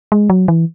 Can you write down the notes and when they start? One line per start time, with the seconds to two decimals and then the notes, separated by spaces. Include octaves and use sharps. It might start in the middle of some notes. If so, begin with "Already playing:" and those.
0.12 G#3
0.30 F#3
0.48 E3